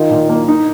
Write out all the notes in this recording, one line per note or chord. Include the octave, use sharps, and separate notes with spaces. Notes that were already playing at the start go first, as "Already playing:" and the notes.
Already playing: D#3 F4
A#2
A#3
D#4